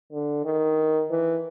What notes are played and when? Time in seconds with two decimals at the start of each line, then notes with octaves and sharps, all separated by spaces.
0.12 D3
0.45 D#3
1.10 E3